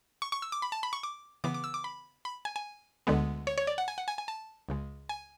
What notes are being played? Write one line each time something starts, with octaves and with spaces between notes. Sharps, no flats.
C#6
C#6
E6
D6
B5
A5
B5
C#6
D6
C#3 E3 B3 D6
D6
E6
D6
B5
B5
G#5
G#5
D2 D3 G#3 B3
C#5
C#5
D5
F#5
G#5
F#5
G#5
G#5
A5
C#2 C#3 G#3
G#5